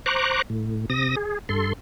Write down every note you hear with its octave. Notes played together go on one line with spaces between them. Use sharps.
C5 A#5 C#6 D6 F#6
A2
C3 D#6 A#6
G#4
G2 A4 C6